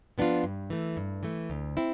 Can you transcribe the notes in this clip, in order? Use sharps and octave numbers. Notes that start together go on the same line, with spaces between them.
F3 B3 D4 F4
G2
E3 A3
G2
E3 A3
D2
C4 E4